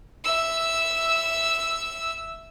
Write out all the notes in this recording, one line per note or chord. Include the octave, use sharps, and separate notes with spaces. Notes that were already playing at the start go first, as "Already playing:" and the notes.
E5 E6